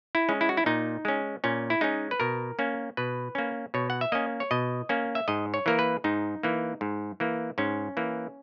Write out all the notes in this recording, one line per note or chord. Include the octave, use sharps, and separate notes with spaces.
E4
G#3 C#4
E4
F#4
E4
A#2 D#4
G#3 C#4
A#2 C#4
E4
G#3 C#4 D#4
B4
B2 A#4
A#3 C#4
B2 B4
A#3 C#4
B2 C#5
F#5
E5
A#3 C#4 D#5
C#5
B2 D#5
A#3 C#4
E5
G#2 D#5
C#5
E3 A#3 A#4
B4
G#2 D#4
E3 A#3
G#2
E3 A#3
G#2 C#4
E3 A#3